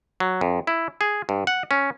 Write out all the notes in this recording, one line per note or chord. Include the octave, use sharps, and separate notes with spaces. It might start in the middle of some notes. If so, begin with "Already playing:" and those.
F#3
F2
E4
G#4
G2
F#5
C#4